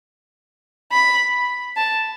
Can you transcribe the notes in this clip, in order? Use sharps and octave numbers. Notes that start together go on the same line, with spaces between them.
B5
A5